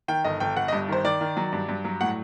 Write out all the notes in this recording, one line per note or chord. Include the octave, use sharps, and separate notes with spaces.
D#3 G5
G1 D#5
G1 G5
G1 F#5
D#5
G2
D#3 C5
D#3 D5
D#3
F#3
G2
G2
F#3
A2 F#5